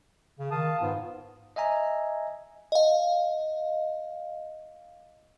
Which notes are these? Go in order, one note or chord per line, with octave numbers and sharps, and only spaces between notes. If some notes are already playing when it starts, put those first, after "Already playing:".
C#3
D#3 F5 A5 D#6
G#2 B3 F4
D#5 E5 G#5 A#5
D#5 F5